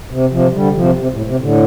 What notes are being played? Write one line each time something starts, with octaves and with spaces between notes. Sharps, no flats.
C3
C3 F3
D3 G3
C3 F3
C3
A2
C3
A2 D3